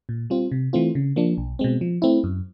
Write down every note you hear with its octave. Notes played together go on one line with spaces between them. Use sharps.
A#2
G3 C4 F4
C3
E3 A3 C4 F4
C#3
F3 A#3 D4
B1
B2 G#3 C4
F3
A3 C4 E4
F#2